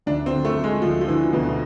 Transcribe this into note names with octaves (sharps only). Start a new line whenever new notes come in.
D2 D4
C4
D3
A3
A3
G#3
D2 F3
F3
D3 E3
D2 B2